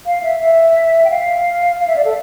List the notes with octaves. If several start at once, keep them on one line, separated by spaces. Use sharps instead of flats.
F5
E5
E5
G5
F5
F5
E5
D5
A4